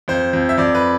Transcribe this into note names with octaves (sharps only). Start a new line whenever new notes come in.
F2 C5
F2
E5
F2 D5
B4